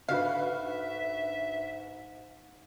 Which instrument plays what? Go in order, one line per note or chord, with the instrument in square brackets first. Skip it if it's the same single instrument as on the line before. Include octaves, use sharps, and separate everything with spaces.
[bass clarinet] G#2 [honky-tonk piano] D3 F#4 B4 [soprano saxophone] E5 [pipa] F5